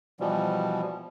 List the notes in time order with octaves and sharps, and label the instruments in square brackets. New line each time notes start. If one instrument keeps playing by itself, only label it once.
[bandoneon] B2 E3 F3 G3